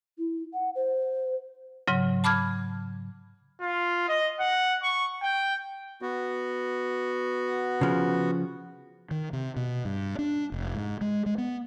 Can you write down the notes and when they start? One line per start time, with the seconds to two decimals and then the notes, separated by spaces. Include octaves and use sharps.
0.18 E4
0.53 F#5
0.75 C5
1.88 G#2 C#3 F#3
2.24 A5 B5 D6 F6 G#6
3.61 F4
4.09 D#5
4.40 F#5
4.83 C#6
5.23 G5
6.02 B3 F#4
7.81 C#3 F3
9.11 D#3
9.33 C3
9.56 B2
9.85 G2
10.19 D4
10.52 F1
10.75 G#2
11.01 G#3
11.26 G#3
11.38 B3